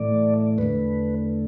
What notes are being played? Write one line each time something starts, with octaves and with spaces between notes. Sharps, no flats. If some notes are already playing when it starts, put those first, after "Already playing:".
Already playing: A2 E3 A3 D5
E2 D3 A3 B4